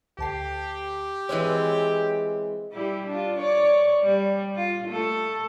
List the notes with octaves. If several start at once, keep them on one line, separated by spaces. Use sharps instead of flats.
D2 G4 A5 C7
E3 G#3 C4 C#5 E6
G3 E4 G4
D4 F4
C#5 D5
G3
F4
A3 A4